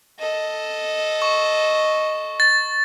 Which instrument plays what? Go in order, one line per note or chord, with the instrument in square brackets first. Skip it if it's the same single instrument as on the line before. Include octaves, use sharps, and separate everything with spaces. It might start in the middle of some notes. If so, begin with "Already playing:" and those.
[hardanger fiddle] A4 D#5
[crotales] C#6
A6